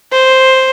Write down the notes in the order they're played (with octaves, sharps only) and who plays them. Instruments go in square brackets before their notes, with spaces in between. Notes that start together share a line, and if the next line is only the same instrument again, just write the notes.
[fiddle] C5